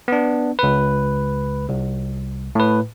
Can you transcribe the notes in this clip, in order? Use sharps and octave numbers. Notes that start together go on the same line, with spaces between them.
B3 D4
C#2 B4
C2
A2 B4